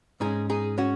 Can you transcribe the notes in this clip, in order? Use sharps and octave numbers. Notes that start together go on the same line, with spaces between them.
G#2 G#3 C#4 D#4 G#4
D#4 G#4
C#4 F#4